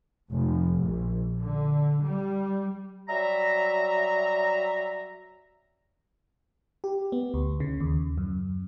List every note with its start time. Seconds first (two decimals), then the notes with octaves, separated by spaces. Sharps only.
0.30 F1
0.80 A#1
1.42 D3
2.04 G3
3.09 F#3 G3 E5 A#5
6.84 G4
7.12 B3
7.34 D2
7.60 C#3
7.80 D#2
8.18 F#2